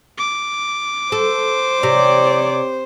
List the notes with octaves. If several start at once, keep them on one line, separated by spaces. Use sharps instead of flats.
D6
A4 C5
C3 C#5 D5